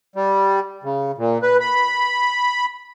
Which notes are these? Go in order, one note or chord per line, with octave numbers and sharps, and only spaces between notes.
G3
C#3
A#2
B4
B5